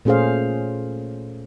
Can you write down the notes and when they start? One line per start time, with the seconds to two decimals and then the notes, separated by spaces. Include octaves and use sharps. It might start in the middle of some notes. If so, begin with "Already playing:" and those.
0.05 A#2 A3 C#4 G#4 C5 F5